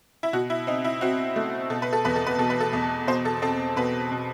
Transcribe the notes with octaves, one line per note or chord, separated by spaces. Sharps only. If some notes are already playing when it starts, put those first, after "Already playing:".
E4
B2 F#4
E4
C4 D#4
E4
C4 F#4
A3
B2 A4
B4
A4
E2 B4
A4
B4
B2 A4
B4
A4
E2
B2 C5
A4
C4 A4
B2 B4
B2